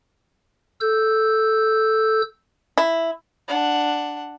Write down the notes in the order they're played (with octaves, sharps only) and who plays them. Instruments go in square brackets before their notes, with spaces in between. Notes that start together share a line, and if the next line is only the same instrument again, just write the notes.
[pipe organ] A4 E6 G6
[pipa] E4
[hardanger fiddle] D4 F#5